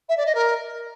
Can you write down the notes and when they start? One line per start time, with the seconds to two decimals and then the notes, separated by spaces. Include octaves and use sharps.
0.09 E5
0.17 D5
0.26 D#5
0.35 A#4